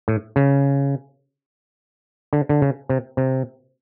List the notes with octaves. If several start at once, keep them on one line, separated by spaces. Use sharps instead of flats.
A2
C#3
D3
D3
C#3
C3
C3